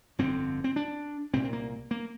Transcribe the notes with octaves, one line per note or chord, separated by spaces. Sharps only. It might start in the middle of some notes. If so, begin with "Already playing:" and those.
G1 F2 D3 C4
C4
D4
C2 A#2 C4
C4
A#3
A#3